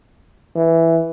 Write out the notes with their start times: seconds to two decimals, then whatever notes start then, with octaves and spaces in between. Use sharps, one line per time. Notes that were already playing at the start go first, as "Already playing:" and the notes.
0.56 E3